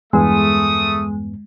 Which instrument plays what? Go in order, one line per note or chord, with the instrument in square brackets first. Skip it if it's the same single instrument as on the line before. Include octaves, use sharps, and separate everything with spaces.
[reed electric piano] E2 G2 B3 [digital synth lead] G#3 [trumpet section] A3 D#6